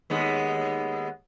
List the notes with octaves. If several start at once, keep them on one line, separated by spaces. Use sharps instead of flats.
D#2 G#3 B3